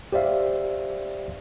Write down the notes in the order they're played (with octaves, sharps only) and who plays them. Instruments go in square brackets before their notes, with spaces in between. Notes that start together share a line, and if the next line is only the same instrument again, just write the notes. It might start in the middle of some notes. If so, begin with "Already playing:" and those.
[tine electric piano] G4 C5 D5 E5 F5